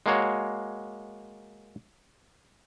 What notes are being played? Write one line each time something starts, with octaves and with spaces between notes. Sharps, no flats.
G#3 A#3 F#4 C#5